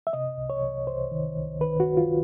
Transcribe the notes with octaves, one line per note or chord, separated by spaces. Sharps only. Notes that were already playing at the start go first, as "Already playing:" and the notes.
E5
C3 D#5
C2
C#5
C2
C2 C5
D#3
C2
D#3 B4
F#4
C2
F4